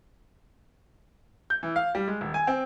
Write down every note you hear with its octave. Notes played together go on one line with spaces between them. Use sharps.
G6
E3
F5
G3
G#3
D#1
G#5
C4